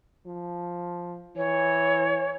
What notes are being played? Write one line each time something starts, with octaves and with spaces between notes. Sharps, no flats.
F3
E3 C#5